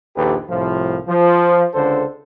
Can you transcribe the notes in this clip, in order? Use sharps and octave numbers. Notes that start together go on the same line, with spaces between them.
A#1 D#2 G4 A4 B4
C2 A2 C3 F3
F3
C#2 D3 A4 C5